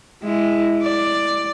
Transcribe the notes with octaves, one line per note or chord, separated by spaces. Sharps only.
G#3 E4
D5